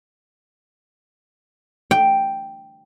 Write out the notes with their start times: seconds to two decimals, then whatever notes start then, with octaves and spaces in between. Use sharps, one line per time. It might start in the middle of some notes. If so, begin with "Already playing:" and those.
1.91 G5